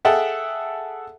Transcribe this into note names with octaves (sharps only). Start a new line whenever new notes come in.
G#4 A4 E5 F#5 G5 A5